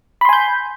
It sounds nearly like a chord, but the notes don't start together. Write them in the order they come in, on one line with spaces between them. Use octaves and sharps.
B5 C6 G#5 G6